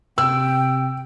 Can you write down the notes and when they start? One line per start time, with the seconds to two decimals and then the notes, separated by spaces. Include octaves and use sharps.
0.18 C3 G5 E6